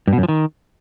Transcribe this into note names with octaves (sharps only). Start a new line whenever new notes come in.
G2
B2
F#2
F3
D#3